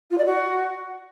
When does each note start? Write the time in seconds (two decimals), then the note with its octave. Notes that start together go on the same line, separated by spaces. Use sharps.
0.10 F4
0.17 D5
0.25 F#4